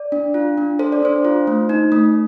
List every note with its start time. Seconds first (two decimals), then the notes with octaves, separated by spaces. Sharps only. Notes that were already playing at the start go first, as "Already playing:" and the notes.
Already playing: D5
0.12 D4
0.34 F4
0.58 D4
0.79 A4 C5
0.92 D5
1.02 D4 C5
1.25 F4
1.47 A3
1.69 D#4
1.92 A3